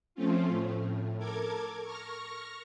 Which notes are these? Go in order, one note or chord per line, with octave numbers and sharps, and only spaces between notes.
F3 A3 C4 C#4 F4
A2
A4 A#4 D6 G#6
C#6 F6 A#6